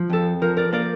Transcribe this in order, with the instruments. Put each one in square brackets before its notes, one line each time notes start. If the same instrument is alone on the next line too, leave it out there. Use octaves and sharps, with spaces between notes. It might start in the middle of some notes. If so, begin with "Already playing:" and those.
Already playing: [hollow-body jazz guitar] F3
[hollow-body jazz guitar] F2 [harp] A4
[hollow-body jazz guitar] F3 [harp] A#4
[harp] A#4 D5
[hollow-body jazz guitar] A#3 [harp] A#4 D5